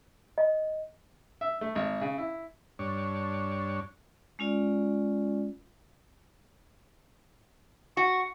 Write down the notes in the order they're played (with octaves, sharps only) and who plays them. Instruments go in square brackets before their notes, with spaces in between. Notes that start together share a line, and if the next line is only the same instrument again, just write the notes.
[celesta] D#5
[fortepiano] E5
A3
G#1
C#3
E4
[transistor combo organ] G2 D4 C#5
[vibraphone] G#3 C#4 F4 D5
[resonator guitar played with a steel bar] F#4 [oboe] C#6